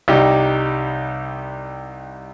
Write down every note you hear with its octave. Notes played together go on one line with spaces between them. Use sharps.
C2 G3 D#4 G4